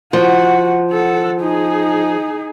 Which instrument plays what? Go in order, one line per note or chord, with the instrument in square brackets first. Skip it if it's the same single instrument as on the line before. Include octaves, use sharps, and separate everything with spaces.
[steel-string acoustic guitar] F3 [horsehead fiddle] F#4 F#5
[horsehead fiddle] A4 F#5
D#4 G#4